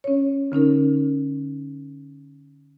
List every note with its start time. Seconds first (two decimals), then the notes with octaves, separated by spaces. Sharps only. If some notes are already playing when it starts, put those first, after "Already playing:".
0.04 C#4 C#5
0.52 D3 C#4 D#4 A#4